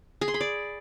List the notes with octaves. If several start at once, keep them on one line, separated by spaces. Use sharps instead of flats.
G#4
C6
B5
D5